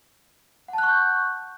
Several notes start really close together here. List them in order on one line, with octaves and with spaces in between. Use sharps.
F#5 A5 F#6 C#6 G6